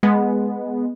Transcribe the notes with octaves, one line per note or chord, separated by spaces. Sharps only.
G#3 B3